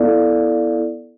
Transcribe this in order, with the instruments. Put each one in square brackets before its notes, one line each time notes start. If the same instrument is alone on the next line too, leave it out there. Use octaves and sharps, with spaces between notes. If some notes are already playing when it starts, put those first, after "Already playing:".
Already playing: [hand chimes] B3 E4 A4 D5 F5